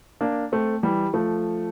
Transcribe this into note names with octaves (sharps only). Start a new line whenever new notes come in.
A#3 D4
A3 C4
E3 G3
F3 A3